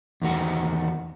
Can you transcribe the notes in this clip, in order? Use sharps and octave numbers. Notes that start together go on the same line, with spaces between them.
E2 D#3 F#4